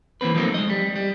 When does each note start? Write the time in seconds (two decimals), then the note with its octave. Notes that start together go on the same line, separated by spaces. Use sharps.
0.21 E3 A#3 C4 B4
0.35 F3 F#3 A3 A#3 C4 D#4
0.54 G#3 D#5
0.70 G3
0.96 G3